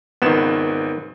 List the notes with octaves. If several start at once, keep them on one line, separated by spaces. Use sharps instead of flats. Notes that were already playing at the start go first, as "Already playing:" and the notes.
G#1 C#2 D#3 B3 E7